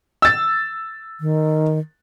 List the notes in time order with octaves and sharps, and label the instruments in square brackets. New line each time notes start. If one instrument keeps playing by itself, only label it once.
[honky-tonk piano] E6 A6
[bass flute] D#3